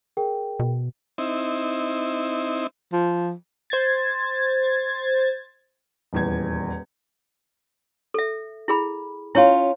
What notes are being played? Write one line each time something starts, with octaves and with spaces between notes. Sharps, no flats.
G#4 A#4 G5
B2
C4 D#4 E4
F3
C5 G#6 A6
D#1 E2 G#6
A4 E5
E4 G#4 B5
C#4 E4 F4 C#5